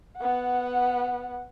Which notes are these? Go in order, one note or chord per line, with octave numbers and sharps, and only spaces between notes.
B3 F#5